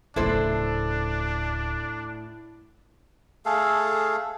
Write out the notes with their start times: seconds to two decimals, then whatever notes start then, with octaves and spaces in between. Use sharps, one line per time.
0.16 D1 A2 C#3 D4 E4 A4 C5
3.45 A3 G#4 A4 F5